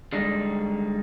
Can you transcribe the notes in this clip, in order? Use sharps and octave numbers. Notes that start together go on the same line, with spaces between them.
D3 G3 G#3 D#4